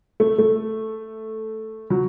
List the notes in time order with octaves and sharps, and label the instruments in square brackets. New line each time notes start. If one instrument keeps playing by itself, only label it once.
[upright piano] A3
A3
F#3